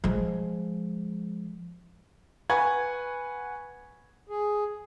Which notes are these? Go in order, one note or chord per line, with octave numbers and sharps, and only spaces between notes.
F3 G#3
B4 F#5 G#5 C#6 G#6
G#4